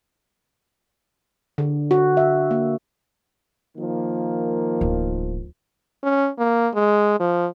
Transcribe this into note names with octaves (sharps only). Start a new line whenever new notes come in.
D3
F#4
E5
A#3
D#3 F3 A#3
D1
C#4
A#3
G#3
F3